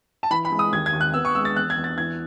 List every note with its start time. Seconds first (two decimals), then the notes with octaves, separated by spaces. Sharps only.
0.23 A5
0.30 E3 B5
0.45 B5
0.52 G#3
0.59 D#6
0.72 D#2 G#6
0.86 G#6
0.93 D#2
1.01 F#6
1.14 B3 E6
1.25 C#6
1.35 G#3 E6
1.45 A6
1.56 E2 F#6
1.70 G#6
1.77 E2
1.84 A6
1.98 E3 G#6